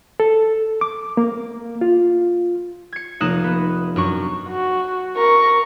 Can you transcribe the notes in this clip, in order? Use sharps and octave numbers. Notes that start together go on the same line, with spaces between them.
A4
D6
A#3
F4
G#6 C#7
F1 A#3 D#4 D#6 F#6 E7
B3
F#2 D4 C#6
F#4
A#4 C#6